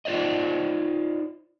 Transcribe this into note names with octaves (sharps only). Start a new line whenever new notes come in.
D#4 F4 C5 D5 D#5